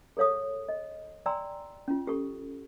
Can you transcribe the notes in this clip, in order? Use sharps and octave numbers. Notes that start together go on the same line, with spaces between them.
G#4 A4 C#5 F5 D#6
D#5
D5 G5 G#5 A#5 C6 E6
C#4 F4
G4 A4 C#6